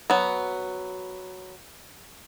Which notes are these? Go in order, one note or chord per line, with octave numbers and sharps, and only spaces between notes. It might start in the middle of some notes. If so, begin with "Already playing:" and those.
F#3 B3